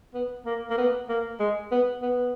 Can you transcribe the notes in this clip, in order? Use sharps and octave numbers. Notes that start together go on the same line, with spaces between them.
B3
A#3
A#3
B3
A#3
G#3
B3
B3